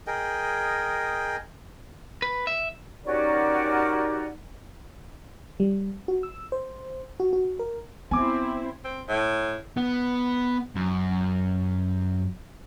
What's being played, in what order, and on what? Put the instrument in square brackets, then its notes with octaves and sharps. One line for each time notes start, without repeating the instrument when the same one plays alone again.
[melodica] G#4 A#4 D#5 G5
[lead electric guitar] B4
E5
[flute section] C#4 F#4 D5 [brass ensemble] D#4 G4 A#4
[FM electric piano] G3
F#4
E6
C5
F#4
F#4
A#4
[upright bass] B3 [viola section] C4 E4 [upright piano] G#5 D6
[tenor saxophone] C4
A2
[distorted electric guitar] B3
F#2